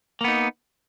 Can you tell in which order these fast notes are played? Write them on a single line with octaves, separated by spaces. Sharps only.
A#3 B3 D#4